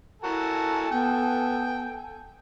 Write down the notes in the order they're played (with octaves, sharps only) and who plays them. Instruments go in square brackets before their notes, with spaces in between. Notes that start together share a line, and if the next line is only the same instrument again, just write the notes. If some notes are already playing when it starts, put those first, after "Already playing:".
[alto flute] E4 [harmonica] F#4 A#4 A5 [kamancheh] A4 G#5
[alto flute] B3 [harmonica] G5